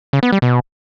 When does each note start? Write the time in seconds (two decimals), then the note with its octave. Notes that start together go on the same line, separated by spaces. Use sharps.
0.13 C#3
0.23 B3
0.32 G3
0.42 B2